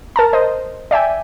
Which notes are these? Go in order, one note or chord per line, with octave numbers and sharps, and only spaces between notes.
A#4 A5 A#5
C5 D#5
D5 E5 G5 G#5